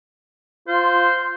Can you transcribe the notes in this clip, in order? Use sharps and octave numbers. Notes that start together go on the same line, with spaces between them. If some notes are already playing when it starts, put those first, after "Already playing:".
F4 C5